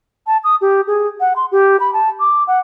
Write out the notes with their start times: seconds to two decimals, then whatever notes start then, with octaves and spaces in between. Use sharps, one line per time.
0.27 A5
0.44 D#6
0.61 G4
0.87 G#4
1.20 F#5
1.36 C6
1.52 G4
1.80 B5
1.93 A5
2.20 D6
2.47 F#5